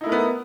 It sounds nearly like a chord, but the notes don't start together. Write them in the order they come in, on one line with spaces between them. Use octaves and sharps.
D#4 E4 A3 A#4 B3